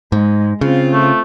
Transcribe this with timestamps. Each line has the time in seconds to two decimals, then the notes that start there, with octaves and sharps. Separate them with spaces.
0.12 G#2 G#3
0.61 C#3 C4 F4
0.93 A3